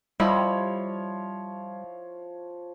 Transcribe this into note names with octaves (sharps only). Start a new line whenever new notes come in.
F3 G3 E4 C#5 D#5